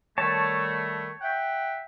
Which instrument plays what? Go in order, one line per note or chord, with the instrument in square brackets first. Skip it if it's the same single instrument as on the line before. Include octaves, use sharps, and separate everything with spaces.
[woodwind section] D#3 G3 A3 [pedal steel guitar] C#5 A5
[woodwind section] E5 F#5 G5